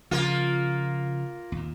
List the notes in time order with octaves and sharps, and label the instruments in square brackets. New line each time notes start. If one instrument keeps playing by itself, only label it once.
[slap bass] C#3 F3 [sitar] A#3 F4
[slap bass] D#2 A#2